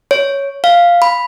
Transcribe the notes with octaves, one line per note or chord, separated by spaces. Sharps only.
C#5
F5
B5